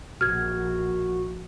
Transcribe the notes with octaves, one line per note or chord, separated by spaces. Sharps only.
A#1 F#4 F6 G#6